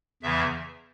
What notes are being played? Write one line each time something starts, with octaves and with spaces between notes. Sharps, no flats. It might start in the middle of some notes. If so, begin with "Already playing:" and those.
E2 C#3 E3 E5